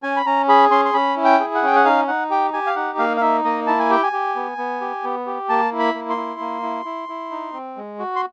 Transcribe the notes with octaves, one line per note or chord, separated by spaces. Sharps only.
C#4 G#5
B5
C#4 A#5
G#4 B5
C#4 C6
C6
C#4 B5
E4
G5
G#4
F#5
C#4 G5
F#5
D#4 F5
D#4 F#5
G4 G5
G4 G#5
F5
D#4 F#5
A#3 F5
F5
D#4 E5
A#3 D#5
E4 A5
G#5
G4 G5
G#5
G4
B3
B3
G4
B3
G4
A#3 A5
E4
B5
A#3
C6
E4
A#3
E4
E4
E4
D#4
C4
G#3
F#4
C6